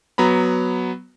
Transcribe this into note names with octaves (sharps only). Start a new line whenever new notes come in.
F#3 B3 A#5 B5